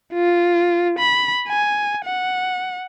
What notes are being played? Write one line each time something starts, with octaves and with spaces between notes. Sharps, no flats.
F4
B5
G#5
F#5